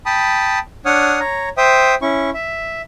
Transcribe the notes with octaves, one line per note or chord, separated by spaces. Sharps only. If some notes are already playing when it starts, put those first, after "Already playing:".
G5 A5 B5 D#6
D4 C#5 F#5 D#6 F6
C#5 A#5
C5 E5 G5 D#6
C#4 E4 C#6
E5